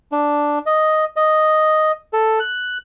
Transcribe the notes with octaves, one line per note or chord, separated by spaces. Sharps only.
D4
D#5
D#5
A4
F#6